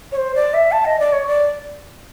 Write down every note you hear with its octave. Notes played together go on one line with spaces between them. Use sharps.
C#5
C5
D5
E5
A5
D#5
D5
C#5
D5